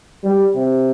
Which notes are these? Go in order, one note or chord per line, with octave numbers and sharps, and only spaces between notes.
G3
C3